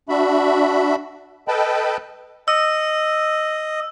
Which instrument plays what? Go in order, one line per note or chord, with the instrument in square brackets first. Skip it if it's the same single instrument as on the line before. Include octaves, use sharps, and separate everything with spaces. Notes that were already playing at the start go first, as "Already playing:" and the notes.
[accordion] D4 F#4 E5 B5
A4 B4 D#5 G5 A5 B5
[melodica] D#5 [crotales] E6